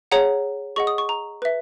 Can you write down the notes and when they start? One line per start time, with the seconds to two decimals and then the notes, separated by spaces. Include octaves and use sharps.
0.12 G#4 C#5 F#5 A#5
0.76 G#4 D#5 F#5 C#6
0.87 D#6
0.98 C#6
1.09 A#5
1.42 B4 E5